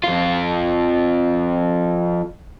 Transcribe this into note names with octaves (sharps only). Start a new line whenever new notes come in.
F2 F4